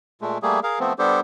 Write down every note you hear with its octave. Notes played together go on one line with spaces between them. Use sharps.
A#2 G#3 A3
G3 A3 A#3 G#4
G#4 A#4 F5
F3 A3 B3 C4
G3 B3 D4 G4 A4 C5